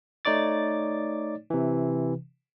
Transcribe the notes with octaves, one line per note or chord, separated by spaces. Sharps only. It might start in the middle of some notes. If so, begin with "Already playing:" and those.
A3 D#4 C#5 D5 D6 A6
C3 E3